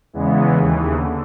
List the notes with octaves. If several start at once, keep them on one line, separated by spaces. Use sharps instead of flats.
E2 C#3 E3 G#3 B3
D#2 C#3 E3
D3